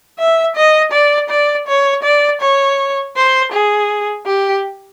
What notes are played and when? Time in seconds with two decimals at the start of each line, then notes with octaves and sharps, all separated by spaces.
0.19 E5
0.56 D#5
0.92 D5
1.30 D5
1.68 C#5
2.04 D5
2.41 C#5
3.16 C5
3.52 G#4
4.26 G4